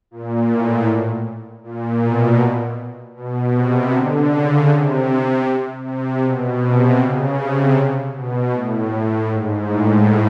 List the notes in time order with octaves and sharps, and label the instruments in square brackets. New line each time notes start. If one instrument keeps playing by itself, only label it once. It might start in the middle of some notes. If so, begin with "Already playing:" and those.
[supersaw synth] A#2
A2
A#2
B2
B2
C3
D3
C#3
C3
C3
B2
C3
C#3
C3
B2
A2
A2
G#2
A2